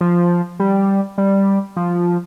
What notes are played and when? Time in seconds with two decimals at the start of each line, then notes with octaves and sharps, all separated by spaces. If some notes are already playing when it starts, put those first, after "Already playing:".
0.01 F3
0.60 G3
1.18 G3
1.76 F3